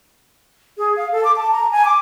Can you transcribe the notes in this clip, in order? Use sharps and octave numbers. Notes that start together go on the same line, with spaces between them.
G#4
F5
A4
D6
A5
A#5
G#5
D6